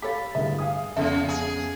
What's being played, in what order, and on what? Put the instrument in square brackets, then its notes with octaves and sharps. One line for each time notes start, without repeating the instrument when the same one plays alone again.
[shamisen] G4 A4 C#5 [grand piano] F5 B5 [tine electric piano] A6 B6
[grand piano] D1 G2 D3 [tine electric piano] G#4 [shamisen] E5
[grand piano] F5 G#5 D#6
[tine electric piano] F2 B3 [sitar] C#3 [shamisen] E4 A4 E5
[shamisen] C#3 [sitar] G#4